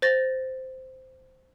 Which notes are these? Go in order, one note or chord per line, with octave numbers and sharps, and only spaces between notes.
C5 A6 A#6